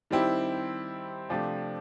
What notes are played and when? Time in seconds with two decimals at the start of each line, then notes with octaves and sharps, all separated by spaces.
0.11 D#3 G3 C4 E4 G4
1.29 C3 F3 A3 D4 G4